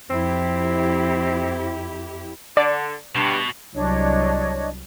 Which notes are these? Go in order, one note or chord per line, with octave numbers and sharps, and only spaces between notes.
F2 C4 E4 G4
D3 D5
G2 B2
C2 F#3 D4 C#5 D#5